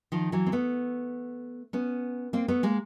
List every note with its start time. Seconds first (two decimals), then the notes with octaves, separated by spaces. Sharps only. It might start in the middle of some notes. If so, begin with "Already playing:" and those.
0.12 D#3 F3
0.32 E3 F#3
0.46 C4
0.52 A3 B3
1.73 B3 C#4
2.33 A#3 C4
2.48 A3 B3
2.63 G#3 A#3